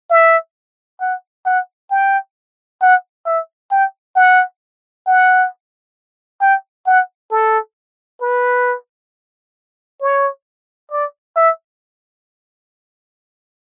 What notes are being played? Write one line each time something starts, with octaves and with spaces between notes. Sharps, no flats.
E5
F#5
F#5
G5
F#5
E5
G5
F#5
F#5
G5
F#5
A4
B4
C#5
D5
E5